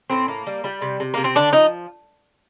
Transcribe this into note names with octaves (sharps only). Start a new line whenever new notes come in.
A2 C4
A#3
G3
G3
C3
C3
C3 A#3
C4
D3 D4
F3 D#4